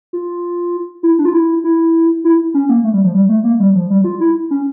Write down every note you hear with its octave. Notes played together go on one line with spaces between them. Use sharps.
F4
E4
D4
F4
E4
E4
E4
C#4
A#3
A3
G3
F3
G3
A3
A#3
G3
F3
G3
F4
E4
C#4